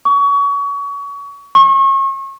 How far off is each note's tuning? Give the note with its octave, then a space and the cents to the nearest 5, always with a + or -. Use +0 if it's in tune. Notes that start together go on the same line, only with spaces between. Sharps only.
C#6 +30
C#6 -35